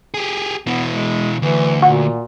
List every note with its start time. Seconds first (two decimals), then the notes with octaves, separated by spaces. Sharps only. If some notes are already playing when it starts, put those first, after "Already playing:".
0.14 G4 G#4
0.67 B2 E3 B3
0.89 G#3
1.42 D2 E3
1.82 A#2 F#4